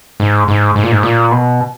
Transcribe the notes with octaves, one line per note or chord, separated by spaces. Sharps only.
G#2
G#2
G#2
A#2
G#2
A#2
B2